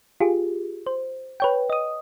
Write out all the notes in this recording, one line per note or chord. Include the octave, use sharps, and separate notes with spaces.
F4 G4 G#4
C5
B4 C#5 G5
D#5 D#6